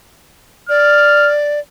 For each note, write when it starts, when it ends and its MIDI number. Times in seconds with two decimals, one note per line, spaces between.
0.69 1.60 74
0.69 1.31 89